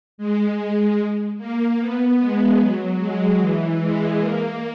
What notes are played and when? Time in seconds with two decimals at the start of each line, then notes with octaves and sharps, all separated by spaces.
0.18 G#3
1.38 A#3
1.79 B3
2.19 G#3
2.60 F#3
2.99 G#3
3.41 E3
3.81 G#3
4.20 A#3